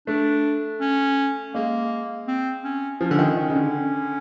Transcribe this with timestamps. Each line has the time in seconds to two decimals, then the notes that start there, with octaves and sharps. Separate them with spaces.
0.07 A3 D4
0.81 C#4
1.54 G#3 A#3
2.28 C4
2.64 C#4
3.00 F3 C#4
3.11 D3
3.19 D#3
3.37 D#3
3.50 C#3
3.55 D3